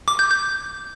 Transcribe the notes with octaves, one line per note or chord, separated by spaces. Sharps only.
D6
G6
G6